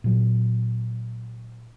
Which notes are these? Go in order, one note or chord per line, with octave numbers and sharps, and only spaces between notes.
A#2 F#3